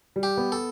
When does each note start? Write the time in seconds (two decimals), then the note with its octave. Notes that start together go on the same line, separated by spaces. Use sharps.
0.16 G3
0.23 G4
0.37 B3
0.52 A4